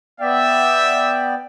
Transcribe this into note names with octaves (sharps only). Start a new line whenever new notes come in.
B3 D5 E5 G5